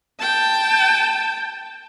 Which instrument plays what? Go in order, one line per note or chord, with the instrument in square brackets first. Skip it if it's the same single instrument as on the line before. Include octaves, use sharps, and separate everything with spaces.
[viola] G5 A5